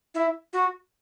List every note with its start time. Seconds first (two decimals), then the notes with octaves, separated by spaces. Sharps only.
0.14 E4
0.53 F#4